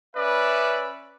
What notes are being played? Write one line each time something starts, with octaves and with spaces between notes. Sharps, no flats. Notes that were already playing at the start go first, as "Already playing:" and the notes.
C#4 B4 D5 E5